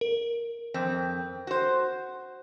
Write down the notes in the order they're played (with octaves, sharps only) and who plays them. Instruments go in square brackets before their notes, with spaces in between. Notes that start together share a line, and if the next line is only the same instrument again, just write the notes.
[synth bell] A#4
[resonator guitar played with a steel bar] F2 C4
F#4 C5